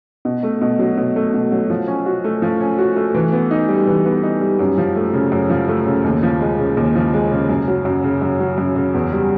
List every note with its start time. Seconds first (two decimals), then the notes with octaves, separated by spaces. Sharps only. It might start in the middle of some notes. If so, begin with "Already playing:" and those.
0.25 B2
0.43 A3
0.61 B2
0.79 F#3
0.97 B2
1.16 A3
1.34 B2
1.52 F#3
1.70 F3
1.88 C#4
2.06 F#4
2.24 A3
2.42 F3
2.60 C#4
2.78 F#4
2.96 A3
3.14 E3
3.33 B3
3.51 D#4
3.69 G3
3.87 E3
4.05 B3
4.23 D#4
4.41 G3
4.59 F#2
4.78 F3
4.96 A3
5.13 C#3
5.32 F#2
5.50 F3
5.68 A3
5.86 C#3
6.04 D#2
6.23 F3
6.41 G#3
6.59 C#3
6.77 D#2
6.96 F3
7.14 G#3
7.31 C#3
7.49 F#2
7.68 F#3
7.85 F#2
8.04 C#3
8.22 F#2
8.40 F#3
8.58 F#2
8.76 C#3
8.94 E2
9.12 G3